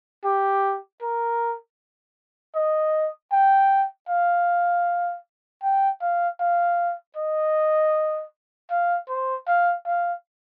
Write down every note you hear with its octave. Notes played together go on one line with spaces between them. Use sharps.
G4
A#4
D#5
G5
F5
G5
F5
F5
D#5
F5
C5
F5
F5